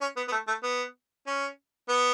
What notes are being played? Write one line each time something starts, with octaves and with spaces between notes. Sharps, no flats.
C#4
B3
B3
A3
A3
B3
C#4
B3